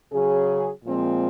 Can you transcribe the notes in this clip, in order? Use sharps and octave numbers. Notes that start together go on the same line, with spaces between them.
C#3 F#3 C#4 G#4
A#2 F3 G#3 C4